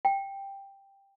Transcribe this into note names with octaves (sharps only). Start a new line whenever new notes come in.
G5